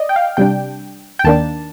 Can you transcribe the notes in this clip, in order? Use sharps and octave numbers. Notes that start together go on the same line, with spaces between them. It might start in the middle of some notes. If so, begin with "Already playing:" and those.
Already playing: D5 D#5
G5
F5
C3 G3 D4 G5
G5
D#2 D#3 A#3 D4 A5